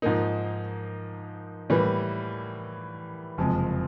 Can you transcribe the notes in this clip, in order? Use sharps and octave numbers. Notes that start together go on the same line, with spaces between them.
G#2 F3 A#3 D#4
A2 E3 G3 A#3
F#1 F2 C3 F3 G#3